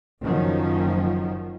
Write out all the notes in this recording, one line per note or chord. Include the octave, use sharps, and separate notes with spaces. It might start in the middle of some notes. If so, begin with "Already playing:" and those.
F#1 D#3 F3 F#3 C#4